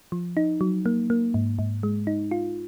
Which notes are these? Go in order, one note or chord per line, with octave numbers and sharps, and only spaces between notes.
F3
D#4
F#3
A#3
A#3
G#2
G#2
G#3
D#4
F4